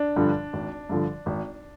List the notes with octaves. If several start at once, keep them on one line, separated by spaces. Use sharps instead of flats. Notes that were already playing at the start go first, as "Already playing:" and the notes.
Already playing: D4
G2 D3 F3
G#1
G2 D3 F3
G#1